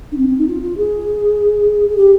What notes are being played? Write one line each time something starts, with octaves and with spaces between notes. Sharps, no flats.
D4
C4
C4
D#4
F4
F4
G#4
G#4
G4